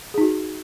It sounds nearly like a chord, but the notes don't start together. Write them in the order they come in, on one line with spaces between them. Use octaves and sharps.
G#4 D#4 F#4